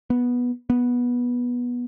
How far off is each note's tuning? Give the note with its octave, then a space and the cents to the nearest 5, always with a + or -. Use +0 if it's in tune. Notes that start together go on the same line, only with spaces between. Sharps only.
B3 -10
B3 -15